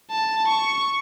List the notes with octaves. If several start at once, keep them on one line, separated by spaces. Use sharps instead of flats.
A5
C#6